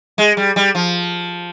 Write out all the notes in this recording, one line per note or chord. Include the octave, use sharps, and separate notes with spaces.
G#3
G3
G3
F3